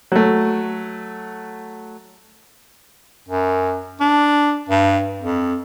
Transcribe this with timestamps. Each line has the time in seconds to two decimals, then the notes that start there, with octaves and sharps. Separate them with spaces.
0.12 F#3 A3
3.28 F#2
4.00 D4
4.69 G2
5.21 F2